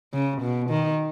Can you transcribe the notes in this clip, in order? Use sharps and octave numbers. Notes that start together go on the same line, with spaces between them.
C#3
B2
D#3